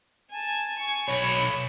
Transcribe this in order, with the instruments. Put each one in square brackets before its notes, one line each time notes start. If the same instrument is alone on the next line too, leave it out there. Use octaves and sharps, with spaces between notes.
[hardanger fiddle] G#5 A5
G#5 C#6
[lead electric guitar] B1 C#5 [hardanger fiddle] B5